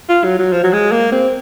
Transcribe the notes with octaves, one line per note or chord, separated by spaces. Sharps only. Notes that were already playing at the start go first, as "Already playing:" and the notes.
F4
F#3
F#3
F3
F#3
G#3
A#3
C4